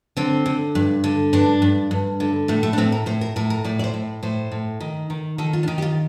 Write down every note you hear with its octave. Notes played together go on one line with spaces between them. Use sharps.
D3 C4
D3
G2
D3
G2 D4
G2
G2
D3
A2 A3
A3
D4
A2 C4
A#4
A2 C5
A#4
A2 A#4
A#4
A2 D5
D5
C5
A2
A2 C5
A2
D#3
D#3
D#3 A4
F4
D4
D#3 D#4
G4
F4